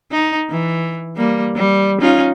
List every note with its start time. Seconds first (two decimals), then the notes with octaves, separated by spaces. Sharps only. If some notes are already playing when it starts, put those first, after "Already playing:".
0.11 D#4
0.50 E3
1.17 G3 A#3
1.56 G3
2.01 C#4 D#4 F4